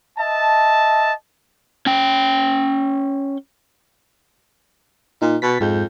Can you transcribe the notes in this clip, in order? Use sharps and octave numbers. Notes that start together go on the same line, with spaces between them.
D#5 E5 A5
C#4 G5
A#2 D#4
B2 A6 B6
F2 G#2 G#3 G6